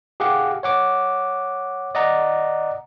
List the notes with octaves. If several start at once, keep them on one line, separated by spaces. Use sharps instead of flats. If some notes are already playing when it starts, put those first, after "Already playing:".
G4 G#4 F5 F#5 D6
C#5 F#5 D6
D5 D#5 F#5 A#5